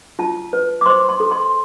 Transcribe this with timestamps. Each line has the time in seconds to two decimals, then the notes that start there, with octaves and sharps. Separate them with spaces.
0.19 F4 A5
0.53 B4
0.81 D6
0.86 C5 C6
1.09 C6
1.20 A4
1.31 C6